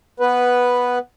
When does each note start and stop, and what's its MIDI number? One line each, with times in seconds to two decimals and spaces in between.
0.20 0.99 59
0.20 0.99 71